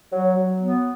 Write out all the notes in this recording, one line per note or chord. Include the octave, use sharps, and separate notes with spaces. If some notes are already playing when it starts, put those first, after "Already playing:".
F#3
F#3
B3